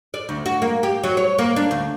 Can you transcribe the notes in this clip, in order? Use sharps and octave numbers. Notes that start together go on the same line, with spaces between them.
D5
D2
F#4
A#3
G4
F#3
C#5
A#3
D4
D2